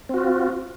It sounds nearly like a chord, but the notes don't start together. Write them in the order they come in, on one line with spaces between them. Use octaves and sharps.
C4 F#4 F4